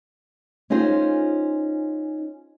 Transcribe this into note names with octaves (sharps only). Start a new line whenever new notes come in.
C#4 D#4 F4 G#4 C5